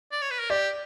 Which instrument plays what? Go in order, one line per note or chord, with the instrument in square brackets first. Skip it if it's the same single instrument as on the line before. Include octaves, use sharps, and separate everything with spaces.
[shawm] D5
C#5
B4
A#4
[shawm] G4 [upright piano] D5